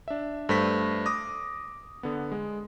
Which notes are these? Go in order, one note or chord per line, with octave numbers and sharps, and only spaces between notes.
D4 E5
G2 A3 B4 C5 A#6 B6
D6 D#6 A#6
D3 B3
G#3